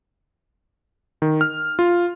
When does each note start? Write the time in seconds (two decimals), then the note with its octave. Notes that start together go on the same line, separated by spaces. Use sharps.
1.22 D#3
1.41 F6
1.79 F4